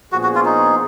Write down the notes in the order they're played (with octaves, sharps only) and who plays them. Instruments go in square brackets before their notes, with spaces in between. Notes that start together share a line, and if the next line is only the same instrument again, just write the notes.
[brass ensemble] A#2 F3 B3 D4 G#4 [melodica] F#4
[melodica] F#4
F4
D#4